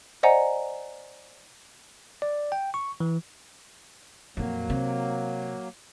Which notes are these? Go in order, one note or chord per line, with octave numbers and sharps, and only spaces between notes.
C5 D5 D#5 F#5 G#5 A#5
D5
G5
C#6
E3
F2 A#2 F#3 A#3
C3